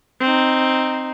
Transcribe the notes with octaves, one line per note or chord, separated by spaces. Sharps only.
C4 D#4